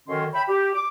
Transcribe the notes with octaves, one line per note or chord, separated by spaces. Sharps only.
F#2 D3 D#3 C#4 D#5 C6
C#5 E5 G5 B5
G4
D6